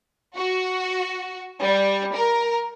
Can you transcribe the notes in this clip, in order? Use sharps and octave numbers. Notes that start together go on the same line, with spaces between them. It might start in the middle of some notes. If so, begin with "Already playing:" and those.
F#4
G3
A#4